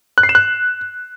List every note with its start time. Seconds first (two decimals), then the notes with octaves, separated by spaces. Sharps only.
0.18 F#6
0.23 C7
0.29 E7
0.35 F#6